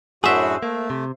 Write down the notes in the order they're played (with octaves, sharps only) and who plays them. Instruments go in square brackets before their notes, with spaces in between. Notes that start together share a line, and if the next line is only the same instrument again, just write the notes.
[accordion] F#2 A2 F#4 [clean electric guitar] D4 G#4 [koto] C5 E5
[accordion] A3 [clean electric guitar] A#3
[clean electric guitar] C3